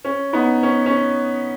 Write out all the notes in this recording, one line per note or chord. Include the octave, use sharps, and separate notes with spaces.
C#4
B3 D#4
C#4
C#4